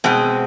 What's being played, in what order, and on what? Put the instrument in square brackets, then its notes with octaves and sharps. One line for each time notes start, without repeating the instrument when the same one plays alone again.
[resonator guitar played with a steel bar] B2 G#3 C4